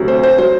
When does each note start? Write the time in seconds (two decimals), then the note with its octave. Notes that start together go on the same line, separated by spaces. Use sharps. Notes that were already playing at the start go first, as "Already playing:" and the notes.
Already playing: D2 C3 F#3
0.08 C5
0.24 C5
0.38 F#3 C5